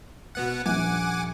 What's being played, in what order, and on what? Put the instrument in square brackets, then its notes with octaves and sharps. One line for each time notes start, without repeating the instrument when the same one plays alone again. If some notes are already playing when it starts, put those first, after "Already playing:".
[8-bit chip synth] B2 B3 F#5
[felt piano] D#1 A#1 [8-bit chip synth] F#5 G#5 D6